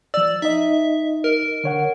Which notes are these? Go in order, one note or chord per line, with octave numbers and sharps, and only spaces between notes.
F3 D5 E6
D#4 D#5 E5
A#4
D3 C#5 F#5